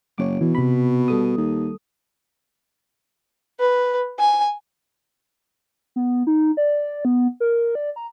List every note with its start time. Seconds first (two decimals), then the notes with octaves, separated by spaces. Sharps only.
0.18 F#1 C#5 D6
0.41 B2 E3
0.55 C3 B5
1.08 G3 A4 D#6
1.37 D#2
3.60 B4
4.19 G#5
5.96 B3
6.27 D#4
6.57 D5
7.05 B3
7.40 A#4
7.75 D5
7.96 A#5